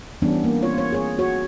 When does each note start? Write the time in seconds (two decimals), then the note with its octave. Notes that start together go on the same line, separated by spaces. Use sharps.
0.22 E3 G3 B3 C#4 D4
0.44 A#3
0.63 C4 F4 C#5
0.78 C#5
0.92 G#4 C#5
1.19 F#4 C#5